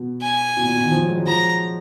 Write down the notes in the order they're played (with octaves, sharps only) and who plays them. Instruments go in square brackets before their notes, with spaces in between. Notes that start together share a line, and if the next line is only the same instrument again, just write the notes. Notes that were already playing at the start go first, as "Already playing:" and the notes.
Already playing: [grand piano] B2
[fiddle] G#5
[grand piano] B2
A#2
B2
D#3
F3
F#3
G#3
F#3
[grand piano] F3 [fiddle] A#5